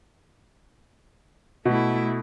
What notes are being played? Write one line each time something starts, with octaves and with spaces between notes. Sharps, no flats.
B2 A3 E4